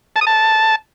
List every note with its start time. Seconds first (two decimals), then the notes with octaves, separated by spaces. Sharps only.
0.16 A5
0.21 D#6
0.27 A5